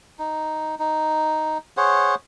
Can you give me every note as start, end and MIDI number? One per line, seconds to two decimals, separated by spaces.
0.19 0.75 63
0.79 1.58 63
1.77 2.15 68
1.77 2.15 72
1.77 2.15 73
1.77 2.15 78